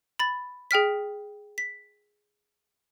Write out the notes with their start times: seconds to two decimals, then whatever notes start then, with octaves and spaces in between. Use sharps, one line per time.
0.19 B5 A6
0.71 G#4 G5 F6 B6
1.58 B6